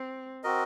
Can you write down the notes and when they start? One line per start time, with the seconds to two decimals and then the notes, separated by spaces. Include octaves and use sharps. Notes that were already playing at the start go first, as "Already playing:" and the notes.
Already playing: C4
0.44 C4 F#4 A#4 D#5